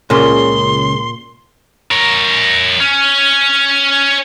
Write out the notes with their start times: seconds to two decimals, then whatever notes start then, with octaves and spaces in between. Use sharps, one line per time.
0.10 C#2 A#2 C#3 C6
1.91 A#4 C#5
2.80 C#4